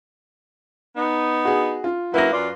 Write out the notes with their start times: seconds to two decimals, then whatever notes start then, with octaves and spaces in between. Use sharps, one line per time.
0.97 B3 D#4
1.45 F#4 G#4
1.84 F4
2.14 F#3 A#3 E4 B4 A#6
2.33 F#2 F4 D5